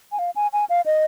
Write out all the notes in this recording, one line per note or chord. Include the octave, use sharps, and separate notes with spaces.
G#5
F5
G#5
G#5
F5
D#5